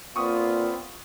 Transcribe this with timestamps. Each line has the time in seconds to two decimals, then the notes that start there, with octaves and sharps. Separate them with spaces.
0.16 A#2 B3 C4 F4 C#6 D#6